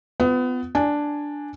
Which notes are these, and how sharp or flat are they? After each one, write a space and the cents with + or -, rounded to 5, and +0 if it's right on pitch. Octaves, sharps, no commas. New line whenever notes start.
B3 +30 F4 +0
D4 +0 G#5 +0